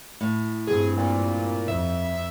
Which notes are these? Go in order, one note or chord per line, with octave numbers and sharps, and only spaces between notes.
A2
G2 C4 G#4
A#2
F2 E5